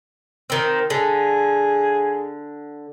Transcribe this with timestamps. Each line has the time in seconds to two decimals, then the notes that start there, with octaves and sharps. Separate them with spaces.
0.50 D#3 C4
0.90 D3 G#4